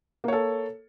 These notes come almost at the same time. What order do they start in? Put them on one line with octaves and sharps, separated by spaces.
A#3 C#5 A4